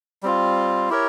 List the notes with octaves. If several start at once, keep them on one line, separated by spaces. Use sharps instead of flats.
G3 C4 F4
E4 G4 A#4 C#5